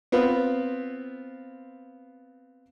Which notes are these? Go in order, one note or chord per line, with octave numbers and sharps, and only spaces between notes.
B3 C4 F4 B4